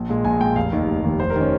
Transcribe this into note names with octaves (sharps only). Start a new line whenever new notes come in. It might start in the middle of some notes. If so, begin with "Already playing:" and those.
Already playing: A#1
A#2 G#3
A#1 G#5
A#2 G#3 G5
F1 F5
D#2 D#3
F1
D#2 D#3
F1 C5
A#4
D#3 C#4